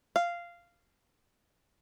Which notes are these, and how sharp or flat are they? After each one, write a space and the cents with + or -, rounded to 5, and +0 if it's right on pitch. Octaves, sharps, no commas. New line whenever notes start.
F5 -10